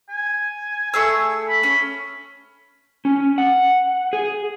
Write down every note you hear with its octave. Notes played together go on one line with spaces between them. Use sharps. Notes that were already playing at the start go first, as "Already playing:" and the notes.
G#5
A3 G#4 E6
B5
C#4
C#4
F#5
G#4